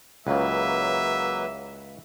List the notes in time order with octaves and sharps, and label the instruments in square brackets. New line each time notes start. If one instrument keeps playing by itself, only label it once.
[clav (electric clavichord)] C#2 C#3 [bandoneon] F#3 A#3 B4 [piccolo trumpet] E5